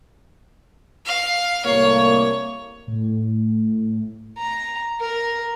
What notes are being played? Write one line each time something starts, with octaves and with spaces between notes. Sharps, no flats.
F5
C2 A2 A#3 C#5
A2
A#5
A#4